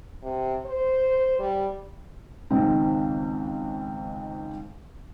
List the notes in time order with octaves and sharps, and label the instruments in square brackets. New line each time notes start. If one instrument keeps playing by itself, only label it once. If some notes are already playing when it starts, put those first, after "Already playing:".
[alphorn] C3
C5
G3
[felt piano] C#2 G#2 D#3 C4